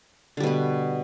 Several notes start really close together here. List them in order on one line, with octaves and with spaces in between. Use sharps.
D3 G3 B2 B3